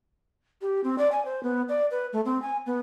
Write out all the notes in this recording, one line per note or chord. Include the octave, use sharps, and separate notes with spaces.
G4
C4
D5
G#5
C5
B3
D5
B4
A3
C4
G#5
B3